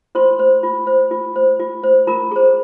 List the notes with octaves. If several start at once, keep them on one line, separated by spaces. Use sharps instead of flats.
F4 C5 C6
C5
F4
C5
F4
C5
F4
C5
F4 A#4 A#5
G#4 C5